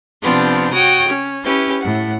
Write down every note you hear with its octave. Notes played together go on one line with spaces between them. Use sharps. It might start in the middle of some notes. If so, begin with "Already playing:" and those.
C3 F3 B3 C4 D4
F#4 C#5 G5 D#6
C#4
C#4 E4 G4 B4
A2 F#5